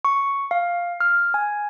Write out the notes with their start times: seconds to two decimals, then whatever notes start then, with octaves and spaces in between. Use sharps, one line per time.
0.05 C#6
0.51 F5
1.00 F6
1.34 G#5